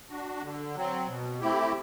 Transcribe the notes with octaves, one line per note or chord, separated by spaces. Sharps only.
D4 F#4
D3
F#3 C4
B2
A3 C4 E4 G4